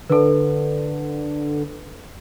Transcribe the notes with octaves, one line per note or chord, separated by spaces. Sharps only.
D3 A4 B4